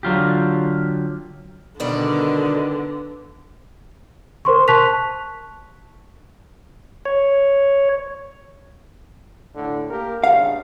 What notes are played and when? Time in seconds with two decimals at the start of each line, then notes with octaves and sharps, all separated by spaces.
0.03 D3 F#3 F4 G4
1.80 B2 D3 D#3 G3 B3 D5
4.45 A#4 C5 C6 C#6
4.68 A5 C#6 F#6 B6 F7
7.05 C#5
9.55 A2 D3
9.89 A#3 G4 A#4
10.24 G2 C#3 F5